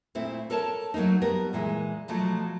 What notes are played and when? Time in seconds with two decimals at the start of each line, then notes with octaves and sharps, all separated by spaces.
0.15 A#2 A3 C4 E4
0.50 A4 A#4 C#5 A5
0.94 F#3 A3 A#3 D#4
1.21 G3 B3 A#4
1.53 A#2 E3 G#3
2.08 B2 F3 F#3 A3